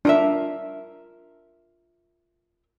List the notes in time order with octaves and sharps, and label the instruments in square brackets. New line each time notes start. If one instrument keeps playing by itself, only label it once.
[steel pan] D4 [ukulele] F4 A#4 E5